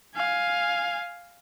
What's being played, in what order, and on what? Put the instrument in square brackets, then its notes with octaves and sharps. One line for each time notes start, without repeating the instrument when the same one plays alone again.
[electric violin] F5 G#5